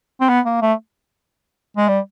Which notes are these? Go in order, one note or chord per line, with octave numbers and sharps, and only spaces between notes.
C4
B3
A#3
A3
G#3
G3